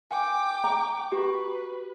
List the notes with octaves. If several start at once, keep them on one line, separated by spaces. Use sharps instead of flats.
G5 G#5 D6
A#5
F#4 G4 B4